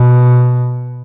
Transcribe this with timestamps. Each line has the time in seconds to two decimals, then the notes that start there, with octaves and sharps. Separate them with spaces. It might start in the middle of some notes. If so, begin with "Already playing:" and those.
Already playing: B2